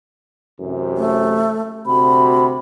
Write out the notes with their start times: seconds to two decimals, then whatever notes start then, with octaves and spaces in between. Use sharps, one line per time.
0.59 A1 F#2 C3
0.97 A3
1.86 D2 C3 F#4 B5